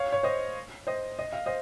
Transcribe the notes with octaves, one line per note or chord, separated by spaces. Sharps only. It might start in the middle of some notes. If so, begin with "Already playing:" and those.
Already playing: C#5 F5
C#5
C5 D#5
C5 D#5
D#5
F5
C5 D#5